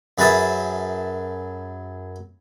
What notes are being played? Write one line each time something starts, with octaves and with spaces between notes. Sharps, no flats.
F#2 G#4 B4 E5 A5 D#6